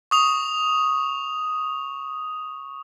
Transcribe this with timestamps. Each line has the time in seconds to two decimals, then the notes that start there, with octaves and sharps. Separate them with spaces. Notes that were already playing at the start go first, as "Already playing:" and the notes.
0.11 C#6 D#6 F7